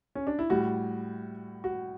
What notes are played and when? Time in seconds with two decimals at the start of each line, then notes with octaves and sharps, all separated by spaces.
0.15 C#4
0.27 D4
0.39 E4
0.50 A2 G3 F#4
1.64 F#4